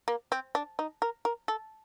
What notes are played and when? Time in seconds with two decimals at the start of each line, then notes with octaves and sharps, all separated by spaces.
0.08 A#3
0.32 C4
0.55 D4
0.79 D#4
1.02 A#4
1.25 A#4
1.48 A4